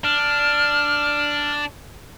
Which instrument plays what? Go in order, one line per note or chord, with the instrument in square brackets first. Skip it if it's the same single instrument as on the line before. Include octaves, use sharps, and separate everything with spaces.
[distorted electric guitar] D4 [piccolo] F6